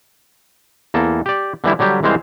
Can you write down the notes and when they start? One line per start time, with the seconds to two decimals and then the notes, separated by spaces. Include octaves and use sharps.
0.94 E2 A#3 A4
1.26 G4 D5
1.64 D3 E3 G3 E4
1.79 D3 F#3 G3 G4
2.03 C2 E3 G#3 C4 C5 F5